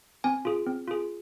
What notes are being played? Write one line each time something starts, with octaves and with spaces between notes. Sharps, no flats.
C4 G#5
F4 G#4
C4
F4 G#4